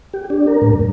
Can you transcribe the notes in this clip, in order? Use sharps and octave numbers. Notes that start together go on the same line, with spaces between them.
G4
D4
A#4
A2
G2